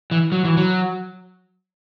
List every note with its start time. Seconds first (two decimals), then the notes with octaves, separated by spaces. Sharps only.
0.11 E3
0.32 F#3
0.45 E3
0.57 F#3